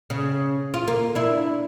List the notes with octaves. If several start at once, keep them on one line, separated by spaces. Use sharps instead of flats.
C#3
F4
A#3
D4 E4